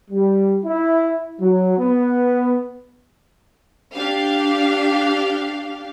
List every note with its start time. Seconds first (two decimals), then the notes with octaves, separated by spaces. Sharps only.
0.11 G3
0.66 E4
1.41 F#3
1.79 B3
3.93 D4 G4 F5